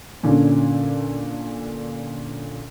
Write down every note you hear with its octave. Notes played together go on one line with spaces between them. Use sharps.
A#2 D3 C#4 D4